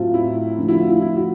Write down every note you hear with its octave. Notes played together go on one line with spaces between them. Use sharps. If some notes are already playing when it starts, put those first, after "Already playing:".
Already playing: A2 F#3 A3 C4 F4
E4
D3 F3 A3
E4 F#4
F4
E4
E4
E4 F#4